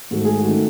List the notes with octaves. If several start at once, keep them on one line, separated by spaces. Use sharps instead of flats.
G#2 D#3 A3 F#4
G#4
F#4
D#3 A3 C#4